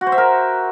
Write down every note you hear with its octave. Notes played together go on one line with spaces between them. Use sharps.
F#4
C5
E5
A#4